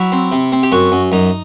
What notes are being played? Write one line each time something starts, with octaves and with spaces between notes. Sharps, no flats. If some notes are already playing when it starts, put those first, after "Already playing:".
Already playing: F#3 E4
C4
C3
C4
G4
F#2 F#4
F#2
F#2 D#4